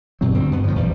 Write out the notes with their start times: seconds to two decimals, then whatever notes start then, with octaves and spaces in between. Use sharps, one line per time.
0.21 G2 B2 F#3 C4
0.34 D2 D3 G3 C4
0.52 G2 B3
0.64 A2 C3 F3
0.76 A#1 E2 G3